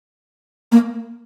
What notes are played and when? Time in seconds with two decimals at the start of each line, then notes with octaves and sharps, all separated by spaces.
0.72 A#3